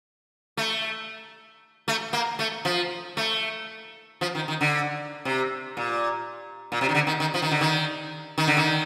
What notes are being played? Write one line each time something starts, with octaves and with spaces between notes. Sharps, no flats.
A3
A3
A#3
A3
F3
A3
F3
D#3
D#3
D3
C3
A#2
A#2
C3
D#3
D3
D#3
D#3
F3
D#3
D3
D#3
D#3
D3
D#3